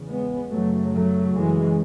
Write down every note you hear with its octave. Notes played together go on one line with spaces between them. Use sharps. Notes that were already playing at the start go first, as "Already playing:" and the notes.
Already playing: E2 C#3
G#3 B3
F#2 C#3 F#3 A3
F#3 A3
F#2 C#3 E3 G#3